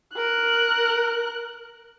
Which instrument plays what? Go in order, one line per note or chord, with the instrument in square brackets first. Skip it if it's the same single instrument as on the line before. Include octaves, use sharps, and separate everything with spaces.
[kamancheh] A#4 F#6